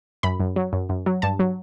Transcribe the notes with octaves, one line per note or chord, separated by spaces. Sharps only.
F#2 B5
F#2
F#3
F#2
F#2
F#3
G2 A5
F#3